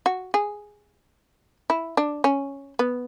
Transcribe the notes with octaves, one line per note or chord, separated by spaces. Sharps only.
F#4
G#4
E4
D4
C#4
B3